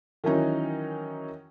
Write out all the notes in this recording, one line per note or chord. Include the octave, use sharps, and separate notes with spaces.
D#3 E3 F#3 C#4 D#4